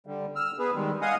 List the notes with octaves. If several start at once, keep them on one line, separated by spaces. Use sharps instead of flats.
D3 G3
E6 F6
B3 G#4 B4
D#3 G3 G#3
D#5 F5 F#5 G#5 D#6